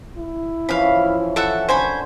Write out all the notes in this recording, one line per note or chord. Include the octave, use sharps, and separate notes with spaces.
E4
E3 F3 C#4 F5 B5
A4 E5 F#5
D3 C5 G#5 B5 C#6